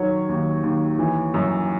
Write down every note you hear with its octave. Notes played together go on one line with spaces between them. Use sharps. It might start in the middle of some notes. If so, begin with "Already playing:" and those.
Already playing: D#3 F#3 C#5
D#2
D#2
E3
F#2